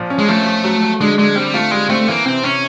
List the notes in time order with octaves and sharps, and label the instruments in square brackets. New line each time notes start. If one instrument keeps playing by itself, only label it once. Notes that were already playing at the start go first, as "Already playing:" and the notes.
Already playing: [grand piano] A#2 F3
C#4
[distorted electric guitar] G#3
[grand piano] F3 [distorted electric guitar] A3
[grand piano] F3
F#3
F#3
[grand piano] D3 [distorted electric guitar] G#3
[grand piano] D3 [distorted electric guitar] G#3
[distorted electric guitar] G3 [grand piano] C4
[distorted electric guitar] A3 [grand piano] F4
[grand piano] G3 [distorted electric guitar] G#3
[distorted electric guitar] A3 [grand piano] C4
[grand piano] E3 [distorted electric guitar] A#3
[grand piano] C3 [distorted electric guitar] C4
[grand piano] C3 [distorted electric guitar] C#4